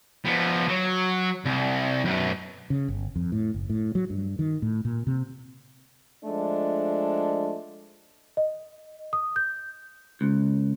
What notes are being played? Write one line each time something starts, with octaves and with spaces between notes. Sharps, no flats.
F3 B3
F#3
C2
F#2 B2
C#3
G1
F2
A2
F#1
A2
F#3
G2
D#3
A2
A#2
C3
F3 G#3 A3 D4
D#5
D#6
G6
C#2